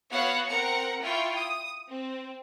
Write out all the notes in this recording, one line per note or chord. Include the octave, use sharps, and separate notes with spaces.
B3 F#4 C#5 F5 F#5
C4 A#4 F#5 A#5 C#7
E4 F4 G5 C#6
D#6
C4